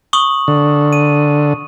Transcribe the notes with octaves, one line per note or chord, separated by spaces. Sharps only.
C#6 D#6 F#7
D3
D#7